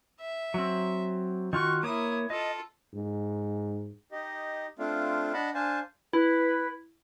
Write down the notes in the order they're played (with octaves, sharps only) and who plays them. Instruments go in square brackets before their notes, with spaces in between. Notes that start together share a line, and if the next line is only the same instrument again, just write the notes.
[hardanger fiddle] E5
[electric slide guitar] F#3 C4
[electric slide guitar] D#3 F4 F#4 [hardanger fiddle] C#6
[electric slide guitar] A#3 C#5 [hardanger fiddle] E4 D#6
[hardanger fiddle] F4 A4 [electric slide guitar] D#5
[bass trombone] G#2
[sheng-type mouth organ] D#4 G4 D#5
A3 C4 D4 F4 F5
D4 D#5 F#5 A5 B5
D4 C5 F5 G#5 A5
[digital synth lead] E4 [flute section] B4